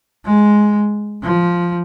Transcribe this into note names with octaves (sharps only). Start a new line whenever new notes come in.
G#3
F3